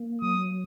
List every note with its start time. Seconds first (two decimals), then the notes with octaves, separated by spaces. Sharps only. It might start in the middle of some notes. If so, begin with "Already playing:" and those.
Already playing: A#3
0.21 F#3 D#6